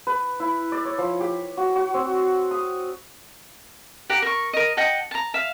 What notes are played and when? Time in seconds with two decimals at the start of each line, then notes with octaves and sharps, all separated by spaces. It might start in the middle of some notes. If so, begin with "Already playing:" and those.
0.07 B4
0.40 E4
0.72 D5
0.85 C#5
0.98 F3
1.21 G4
1.57 F#4
1.76 F#4
1.94 C4
2.51 D#6
4.10 G4 F#5 A#5
4.22 A#4 C#6
4.53 A#4 D#5
4.77 D#5 F#5 G5 A5
5.11 A5 A#5
5.34 E5 F5